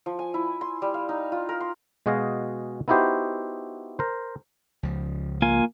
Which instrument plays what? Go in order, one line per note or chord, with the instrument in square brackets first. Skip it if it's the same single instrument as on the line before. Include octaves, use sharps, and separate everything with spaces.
[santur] F3
G#5
E4
C6
G3
F5
D#4
F4
A#4
C6
[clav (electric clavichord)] B2 G#3 F#4 G#4 D#5 F5
B3 D#4 E4 F#4 G4 C5
A#4 C5
[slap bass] C#2 F3
[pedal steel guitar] A#3 F4 G#5